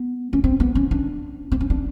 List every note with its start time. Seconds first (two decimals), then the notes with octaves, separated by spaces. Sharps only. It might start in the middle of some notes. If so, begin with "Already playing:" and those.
Already playing: B3
0.33 C#4
0.44 C4
0.60 B3
0.75 C#4
0.91 D4
1.52 C4
1.61 C#4
1.70 D4